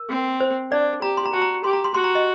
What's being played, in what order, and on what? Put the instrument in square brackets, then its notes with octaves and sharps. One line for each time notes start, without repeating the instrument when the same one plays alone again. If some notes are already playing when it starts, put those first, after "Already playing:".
Already playing: [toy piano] A#4
[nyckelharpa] C4
[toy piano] C5
[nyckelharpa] D4 [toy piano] D5
[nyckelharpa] G4 [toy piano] A#5
[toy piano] C6
A#5
[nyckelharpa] F#4 [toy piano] A5
[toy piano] A#5
[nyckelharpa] G4 [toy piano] C6
[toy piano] A#5
C6
[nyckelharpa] F#4 [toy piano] C6
[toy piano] A#5
D#5